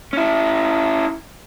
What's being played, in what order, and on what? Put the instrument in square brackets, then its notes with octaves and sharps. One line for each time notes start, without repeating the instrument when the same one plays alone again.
[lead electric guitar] C#4 E4